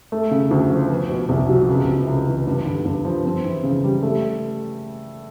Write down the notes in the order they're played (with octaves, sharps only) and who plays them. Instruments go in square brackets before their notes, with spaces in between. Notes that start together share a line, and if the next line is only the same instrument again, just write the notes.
[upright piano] A3
C#3
D2
F3
B3
B2
C2
F#3
C#2
C3
C#2
E3
G2
D3
G2
F3
C4
E3
C#3
G3
A3